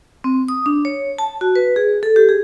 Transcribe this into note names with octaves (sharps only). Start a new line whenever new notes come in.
C4
D#6
D4
C#5
A5
F#4
B4
G#4
A4
G4
G#4